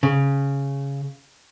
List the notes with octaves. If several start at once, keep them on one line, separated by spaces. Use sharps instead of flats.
C#3